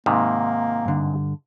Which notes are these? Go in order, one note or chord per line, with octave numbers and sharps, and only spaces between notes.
G#2 C3 D#3 A#3
G2 D3